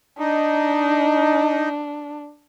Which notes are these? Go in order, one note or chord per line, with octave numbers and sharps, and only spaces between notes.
D4 D#4